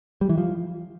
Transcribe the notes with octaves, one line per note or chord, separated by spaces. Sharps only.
G3
E3
F3